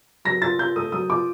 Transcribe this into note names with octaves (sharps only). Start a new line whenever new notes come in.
F#3 A#6
F4 A6
F4 G6
A3 D#6
F#3 D#6
F4 D6